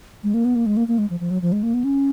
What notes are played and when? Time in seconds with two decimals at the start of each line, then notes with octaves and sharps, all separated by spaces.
0.23 G#3
0.34 A#3
0.45 B3
0.56 A#3
0.66 G#3
0.77 A#3
0.88 A#3
0.98 G#3
1.10 F3
1.20 F3
1.31 F#3
1.42 F3
1.52 G#3
1.63 A#3
1.74 B3
1.84 C#4